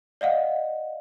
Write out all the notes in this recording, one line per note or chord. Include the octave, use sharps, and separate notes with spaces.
D5 D#5 F5 F#5